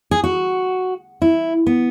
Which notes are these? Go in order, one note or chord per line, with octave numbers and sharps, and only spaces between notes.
G#4
F#4
E4
B3